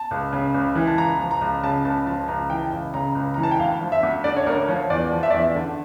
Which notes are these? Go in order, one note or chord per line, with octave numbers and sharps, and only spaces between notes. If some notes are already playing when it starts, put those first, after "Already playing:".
Already playing: A5
C#2
C#3
C#2
E3
A5
C#2 A#5
F3
A#5
C#2
C#3 A5
C#2 A5
F3 A5
C#2 A#5
E3 G5
A5
C#2
C#3 A#5
C#2
A#5
E3
A5
G5
D2 F5
F3
E5
D2
D3 D5
C#5
D2 A#4
F3 C#5
E2 D5
F3
E5
D5
E2 E5
D3